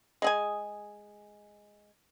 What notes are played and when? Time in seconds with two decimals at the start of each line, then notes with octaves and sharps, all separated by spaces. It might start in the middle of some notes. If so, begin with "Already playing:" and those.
0.22 G#3 G#4 G#5